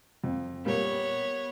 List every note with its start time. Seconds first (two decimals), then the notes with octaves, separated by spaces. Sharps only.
0.24 F2
0.65 A#2 G3 A#3 B3 C#5